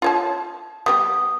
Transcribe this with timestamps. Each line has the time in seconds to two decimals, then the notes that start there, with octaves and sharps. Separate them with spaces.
0.02 F4 C#5 A5
0.86 G3 B3 G4 D#6